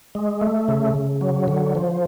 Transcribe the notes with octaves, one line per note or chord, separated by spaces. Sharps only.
G#3
A3
C#3
C#3
F#3
D3
F3